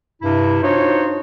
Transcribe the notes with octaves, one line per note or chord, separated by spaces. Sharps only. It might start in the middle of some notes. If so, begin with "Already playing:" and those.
G2 C3 E4
D4 D#4 F4 F#4 C5 C#5